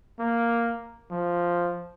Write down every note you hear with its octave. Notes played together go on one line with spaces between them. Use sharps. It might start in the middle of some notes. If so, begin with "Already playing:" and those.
A#3
F3